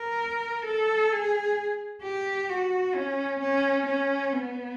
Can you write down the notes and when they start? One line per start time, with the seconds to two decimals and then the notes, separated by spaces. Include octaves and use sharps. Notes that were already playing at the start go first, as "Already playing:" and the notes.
Already playing: A#4
0.66 A4
1.12 G#4
2.03 G4
2.49 F#4
2.95 C#4
3.41 C#4
3.87 C#4
4.33 B3